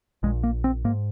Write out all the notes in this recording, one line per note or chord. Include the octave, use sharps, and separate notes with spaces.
A#1 A#2 G#3
A#3
C4
G#2 A#3